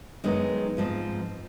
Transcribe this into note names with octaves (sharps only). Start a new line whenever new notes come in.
F#2 D#3 G#3 B3 D#4
G#2 F3 G#3 C4